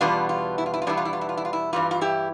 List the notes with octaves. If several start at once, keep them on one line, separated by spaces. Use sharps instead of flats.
E2 B2 G3 B3 D4 F4
F4
E4
F4
E4
F4
E2 B2 G3 B3 D4 E4
F4
E4
F4
E4
F4
E4
F4
E4
G2 E3 G3 F4
F4
E4 G4